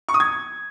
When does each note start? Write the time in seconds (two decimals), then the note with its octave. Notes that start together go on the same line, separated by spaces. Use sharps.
0.09 C#6
0.14 D#6
0.20 G#6